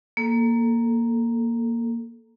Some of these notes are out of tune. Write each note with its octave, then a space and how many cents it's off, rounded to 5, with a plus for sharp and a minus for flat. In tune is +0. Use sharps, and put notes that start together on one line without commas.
A#3 +0 A4 +0